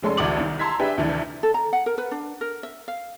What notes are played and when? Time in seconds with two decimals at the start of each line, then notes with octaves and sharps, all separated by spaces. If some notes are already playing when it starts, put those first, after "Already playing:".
0.03 F1 G#3 C#4 A4 D5 C6
0.17 A1 D2 F#4 D5 D6 F#7
0.37 C2 D#3
0.59 A5 A#5 C6 E6 G#6 B6
0.79 D4 G4 G#4 B4 E5 G5
0.98 D2 C3 D#3 E3 D4
1.43 A4
1.54 A#5
1.73 F#5
1.86 A#4
1.98 B4
2.11 D4
2.41 A#4
2.63 E5
2.88 F5